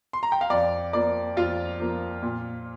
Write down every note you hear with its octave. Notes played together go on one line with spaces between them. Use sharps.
C6
A#5
G5
F5
F2 D5
F3 A#3 D5
F2 F4 F5
F3 A#3
A#2